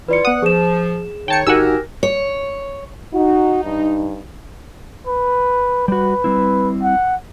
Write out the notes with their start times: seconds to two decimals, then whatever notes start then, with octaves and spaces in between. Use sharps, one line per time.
0.08 E3 E4 F4 B4 D5 C#7
0.25 B3 F#5 D#6
0.42 F3 G#4 E7
1.28 D#3 D#4 C#5 G5 A5 C#7
1.47 G1 D#4 F#4 G4 A#4 F#5 G#5 E6
2.03 C#5
3.14 D#4 F#4
3.64 G2
5.07 B4
5.88 G3 F#4 B4
6.24 G3 C4 E4
6.83 F#5